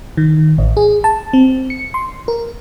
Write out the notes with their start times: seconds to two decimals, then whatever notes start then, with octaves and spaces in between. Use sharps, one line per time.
0.17 D#3
0.58 A1
0.77 G#4
1.04 A5
1.33 C4
1.70 C#7
1.94 C6
2.28 A#4